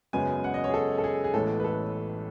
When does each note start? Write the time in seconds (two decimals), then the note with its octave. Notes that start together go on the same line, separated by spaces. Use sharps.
0.13 F#2 C#3 G#3 B3 G#5
0.44 F#5
0.54 D#5
0.64 C#5
0.69 G#4
0.74 A4
0.98 A4
1.04 G#4
1.24 G#4
1.34 A1 A2 G#3 B3 A4
1.60 B4
1.64 A4